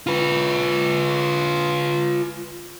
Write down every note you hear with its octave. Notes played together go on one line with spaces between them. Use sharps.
F4 B4